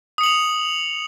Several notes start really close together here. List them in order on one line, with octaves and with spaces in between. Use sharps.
D#6 C#7 F#7 F7